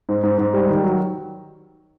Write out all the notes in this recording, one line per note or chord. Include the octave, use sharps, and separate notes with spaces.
G#2
G#2
G#2
G3
D#3
F#3